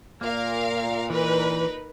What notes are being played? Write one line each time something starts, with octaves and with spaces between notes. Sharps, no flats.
A#2 A#3 A#4 F5
E3 D#4 A#4 B4